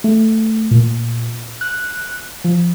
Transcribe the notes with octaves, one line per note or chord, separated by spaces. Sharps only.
A3
A#2
F#6
F3